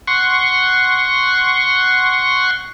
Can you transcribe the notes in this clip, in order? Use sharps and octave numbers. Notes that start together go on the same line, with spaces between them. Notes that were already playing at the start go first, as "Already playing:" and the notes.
F#5 C6 C#6